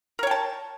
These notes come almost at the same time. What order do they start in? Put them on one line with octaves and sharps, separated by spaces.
A#4 C#5 G5 A5